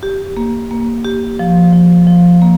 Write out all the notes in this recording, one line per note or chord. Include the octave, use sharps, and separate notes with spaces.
G4
A#3
A#3
G4
F3
F3
F3
A#3